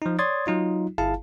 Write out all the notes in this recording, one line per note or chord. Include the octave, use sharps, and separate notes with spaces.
F3 D#4
C#5 D5 C6 D#6 G#6 A6
F#3 D#4 F4
G1 E4 G#4 F5 A5